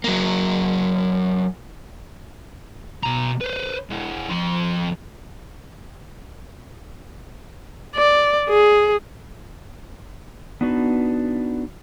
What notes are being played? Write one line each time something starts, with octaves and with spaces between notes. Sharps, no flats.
F#3 A#3
B2 A#5
B4 C5
G#3 E4
F2 C6
D5
G#4
B3 D4 D#4 F#4 B4